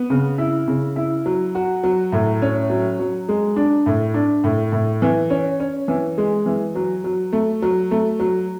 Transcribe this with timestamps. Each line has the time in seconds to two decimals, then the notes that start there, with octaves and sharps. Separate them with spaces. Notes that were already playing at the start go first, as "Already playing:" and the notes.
Already playing: B3
0.10 C#3
0.38 E4
0.68 C#3
0.96 E4
1.26 F#3
1.55 F#4
1.84 F#3
2.12 A2
2.42 C#4
2.70 F#3
2.99 F#3
3.29 G#3
3.56 D4
3.86 A2
4.14 D4
4.44 A2
4.72 A2
5.02 E3
5.30 C#4
5.60 C#4
5.88 E3
6.18 G#3
6.46 E3
6.75 F#3
7.04 F#3
7.33 A3
7.62 F#3
7.91 A3
8.20 F#3